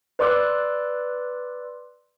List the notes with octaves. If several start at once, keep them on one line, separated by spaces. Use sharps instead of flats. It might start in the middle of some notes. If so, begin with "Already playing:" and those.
B4 D5 C6 D6 E6 F#6